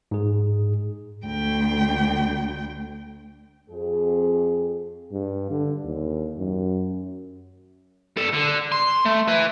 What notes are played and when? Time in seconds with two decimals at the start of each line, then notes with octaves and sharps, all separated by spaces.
0.11 G#2 G#4
1.26 D2 G5
3.70 F2 G#4
5.12 G2
5.51 D3
5.84 D#2
6.38 F#2
8.17 G3 A4
8.33 D3
8.72 C6
9.05 A3
9.28 B4 E5